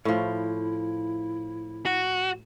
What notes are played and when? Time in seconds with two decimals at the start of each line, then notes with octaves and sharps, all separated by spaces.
0.05 A2 F3 E4
1.86 F#4